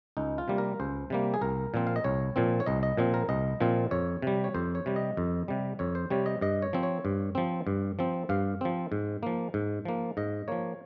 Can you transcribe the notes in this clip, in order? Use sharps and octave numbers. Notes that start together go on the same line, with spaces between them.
C#2 D#4
F4
C3 G3 A#3
A#4
C#2 C5
C3 G3 A#3
G#4
C2 A#4
A#2 F3 C4
F5
D#5
C2 C#5
A#2 F3 C4
C#5
C2 D#5
D#5
A#2 F3 C4
A#4
C2 D#5
A#2 F3 C4
F2 C#5
C3 G3
C#5
F2 C5
C#5
C3 G3
D#5
F2
C3 G3
F2 C#5
C5
C3 G3 C#5
D#5
G2 D#5
C#5
F3 C4
C#5
G2
F3 C4
G2
F3 C4
G2 F5
F3 C4
G#2
F3 A#3
G#2
F3 A#3
G#2 D#5
F3 A#3 C#5